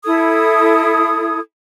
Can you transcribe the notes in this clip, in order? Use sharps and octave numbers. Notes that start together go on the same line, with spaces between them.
E4 A4 D#6 G#6